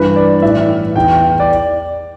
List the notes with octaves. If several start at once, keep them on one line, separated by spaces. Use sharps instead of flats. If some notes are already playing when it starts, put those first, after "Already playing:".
Already playing: G2 E3 B4
D5
A2 E3 E5
E2 E3 G5
D5